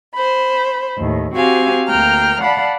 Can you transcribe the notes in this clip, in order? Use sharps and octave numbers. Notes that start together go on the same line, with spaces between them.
C5 B5
D#2 A2
C4 F#4 G4 F5 G#5
D2 A#3 G5 A#5 F6
D5 F5 F#5 A5 B5